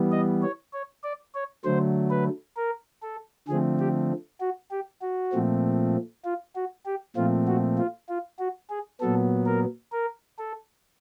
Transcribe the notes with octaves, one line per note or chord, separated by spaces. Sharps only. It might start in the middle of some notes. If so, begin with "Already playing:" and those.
Already playing: E3 G3 B3
D#5
C#5
C#5
D5
C#5
D3 F#3 A3 C5
B4
A#4
A4
D3 F3 A3 C4 G#4
G4
F#4
G4
F#4
A#2 F3 A3 C4
F4
F#4
G4
A#2 F3 A3 C4 F4
F#4
F4
F4
F#4
G#4
A#2 F#3 B3 A4
A#4
A#4
A4